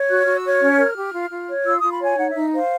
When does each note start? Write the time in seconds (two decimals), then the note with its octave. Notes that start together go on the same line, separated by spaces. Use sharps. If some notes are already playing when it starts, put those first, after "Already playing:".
Already playing: C#5
0.09 F#4 F#6
0.23 F#4 F6
0.36 E6
0.44 C#5 F6
0.61 C#4
0.79 A#4
0.96 G4
1.13 F4
1.31 F4
1.48 C#5
1.65 F4 E6
1.79 F4 D#6
1.91 B5
2.00 C#5 G#5
2.18 D#4 F#5
2.30 D#4 E5
2.52 C5 F5